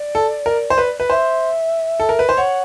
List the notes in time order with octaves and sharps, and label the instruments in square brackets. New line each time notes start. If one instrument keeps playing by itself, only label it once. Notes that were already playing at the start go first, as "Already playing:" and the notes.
Already playing: [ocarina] D5
[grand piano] A4
A#4
C5
B4
B4
[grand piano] C5 [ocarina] E5
[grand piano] A4
A#4
B4
C5
[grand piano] C#5 [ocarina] F#5